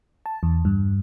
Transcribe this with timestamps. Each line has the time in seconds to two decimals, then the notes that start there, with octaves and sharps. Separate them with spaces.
0.26 A5
0.43 E2
0.65 G2